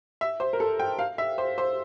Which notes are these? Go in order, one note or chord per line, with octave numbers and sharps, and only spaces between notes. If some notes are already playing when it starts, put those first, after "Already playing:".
E5
C5
A#4
A4
G5
F5
E5
C5
C5